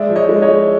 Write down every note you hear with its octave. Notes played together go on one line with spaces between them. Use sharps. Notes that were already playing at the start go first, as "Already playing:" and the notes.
Already playing: G#3 D5 E5
F3
C#5 D#5
G#3
C#5 D#5
G#3